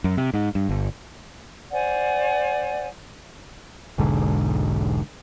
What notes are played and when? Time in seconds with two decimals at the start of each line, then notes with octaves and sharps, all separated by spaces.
0.04 F#2
0.17 C3
0.34 G#2
0.55 G2
0.69 G1
1.71 C5 D5 F#5 G#5
3.98 E1 B1 G#2 D3